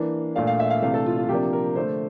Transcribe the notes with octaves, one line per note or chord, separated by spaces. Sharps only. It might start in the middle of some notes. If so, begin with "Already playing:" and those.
Already playing: E3 A#3 D4
A#2 A3 D4 F5
F5
E5
F5
C3 E3 A3 D4 F5
A4
F4
F4
C3 F3 A#3 D4 G4
A#4
D3 A3 D4 C5